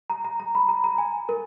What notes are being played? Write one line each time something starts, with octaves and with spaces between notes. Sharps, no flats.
A#5
A#5
A#5
B5
A#5
A#5
G#5
A#4